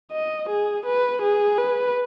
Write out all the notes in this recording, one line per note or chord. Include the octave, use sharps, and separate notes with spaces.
D#5
G#4
B4
G#4
B4